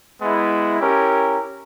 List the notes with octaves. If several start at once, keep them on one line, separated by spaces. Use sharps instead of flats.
G#3 B3 E4
C#4 E4 G4 A#4